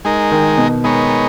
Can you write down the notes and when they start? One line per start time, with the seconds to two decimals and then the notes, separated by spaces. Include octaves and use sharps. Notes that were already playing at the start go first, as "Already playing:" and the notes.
0.05 G#3 D#4 A#4
0.31 D#3
0.58 B2
0.84 G#3 B3 D#4 A#4 C#5